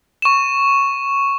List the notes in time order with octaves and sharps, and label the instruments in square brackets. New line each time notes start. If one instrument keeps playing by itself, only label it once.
[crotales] C#6 E7